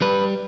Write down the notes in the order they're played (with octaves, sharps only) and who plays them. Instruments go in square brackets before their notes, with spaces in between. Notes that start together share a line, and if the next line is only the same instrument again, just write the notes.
[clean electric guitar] G3 B4